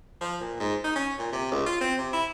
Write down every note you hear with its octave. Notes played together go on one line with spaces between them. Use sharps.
F3
A#2
G#2
D#4
C#4
A#2
C3
C#2
F4
C4
C3
E4